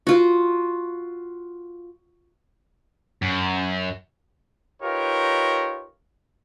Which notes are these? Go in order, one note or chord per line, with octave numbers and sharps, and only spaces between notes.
F4 F#4
F#2
D#4 F4 G4 A#4 B4 C#5